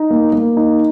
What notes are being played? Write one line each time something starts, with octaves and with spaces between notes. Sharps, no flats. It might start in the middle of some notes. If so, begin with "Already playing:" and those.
Already playing: D#4
A#3
A#3
D#4